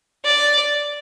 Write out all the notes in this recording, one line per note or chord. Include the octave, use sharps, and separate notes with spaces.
D5